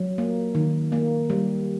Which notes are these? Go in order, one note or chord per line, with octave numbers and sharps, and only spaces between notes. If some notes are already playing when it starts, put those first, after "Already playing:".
Already playing: F#3
A#3
D#3
A#3
G3